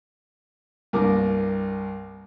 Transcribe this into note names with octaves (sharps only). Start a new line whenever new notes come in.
C2 G2 A#3 A#4 D6